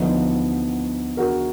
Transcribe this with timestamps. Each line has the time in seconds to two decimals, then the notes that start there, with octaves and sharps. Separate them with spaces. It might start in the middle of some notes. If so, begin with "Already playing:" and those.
Already playing: D2 D3 F3 B3 D#4
1.17 F#4 A#4